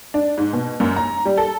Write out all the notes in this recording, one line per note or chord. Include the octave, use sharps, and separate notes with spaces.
D4
G#2
B2
F#2
A#5
G3
A4